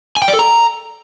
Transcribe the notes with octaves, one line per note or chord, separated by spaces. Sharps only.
G#5
G5
D5
A4
A#5